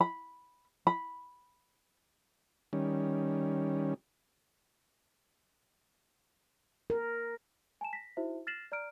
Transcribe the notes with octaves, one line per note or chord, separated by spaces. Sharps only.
B5
B5
D#3 G3 C#4
A#4
G#5 A5 E7
A#6 B6
D#4 E4 F#4 C5 E5
F6 A6 A#6 C7 E7 F#7
D5 A#5 F6 D7